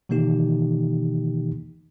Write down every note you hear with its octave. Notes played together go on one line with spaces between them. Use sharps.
B2 D#3 E3 A#3 D#4 G4